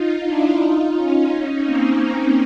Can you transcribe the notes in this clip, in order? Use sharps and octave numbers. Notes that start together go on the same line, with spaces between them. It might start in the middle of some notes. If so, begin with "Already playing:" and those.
Already playing: D#4 F4
D4 E4
D#4 F4
C#4 D#4
C#4 D#4
A#3 C4